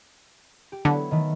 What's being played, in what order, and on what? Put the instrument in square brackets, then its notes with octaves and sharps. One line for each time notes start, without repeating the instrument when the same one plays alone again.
[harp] G4
[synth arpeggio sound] D3 [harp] F#3 B3 E4
[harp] D#3 E3 A3